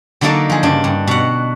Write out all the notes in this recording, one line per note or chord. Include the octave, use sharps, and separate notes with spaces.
D3 F#3 A#3 D#4 A4 D5
F3 G#4
G2 C#3 D4
G2
B2 F#5